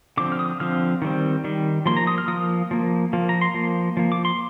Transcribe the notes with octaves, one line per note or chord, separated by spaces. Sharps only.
D3 F3 C4 D6
F6
D#6
D3 F3 C4 F6
D#3 G3 C4
D#3 G3
F3 A#3 C6
A#5
D#6
F6
F3 A#3 D#6
F3 A#3
F3 A#3
A#5
C6
F3 A#3
F3 A#3
D6
C6